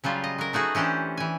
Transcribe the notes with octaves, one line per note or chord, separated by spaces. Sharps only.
C#3 F#3 G3 F4 G#5
D#5
F#3 A#4
A3 D#4 F#4 G#4 B4
E3 C#4 D4 G4 C5
E3 G#5